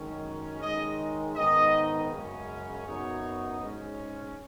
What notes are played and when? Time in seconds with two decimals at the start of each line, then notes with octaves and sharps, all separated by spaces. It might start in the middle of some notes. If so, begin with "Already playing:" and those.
Already playing: F#2 D#3 G#3 C#4
0.60 D#3 G#3 C#4 D#5
1.36 G#2 D#3 B3 D#4 D#5
2.10 F#2 C#3 G#3 C#4
2.85 F#2 F#3 B3 D#4 C#5
3.60 G#2 G#3 C#4